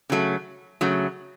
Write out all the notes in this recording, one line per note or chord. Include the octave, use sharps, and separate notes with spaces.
C#3 F#3 A3
C#3 F#3 A3